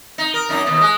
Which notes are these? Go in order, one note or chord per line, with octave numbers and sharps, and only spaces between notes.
D#4
A#4
F#2 D#4
D#2 B2
G#3